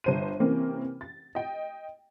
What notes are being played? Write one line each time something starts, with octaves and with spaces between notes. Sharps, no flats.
G1 C5 D#7
C3 E3 A#3 C4 C#4
A6
D#5 G5